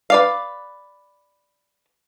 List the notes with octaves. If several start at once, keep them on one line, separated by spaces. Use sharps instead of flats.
B4 D5 F5